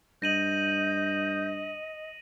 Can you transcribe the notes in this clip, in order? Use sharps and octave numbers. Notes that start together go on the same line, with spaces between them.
G2 D#5 G6 A#6 D#7 F#7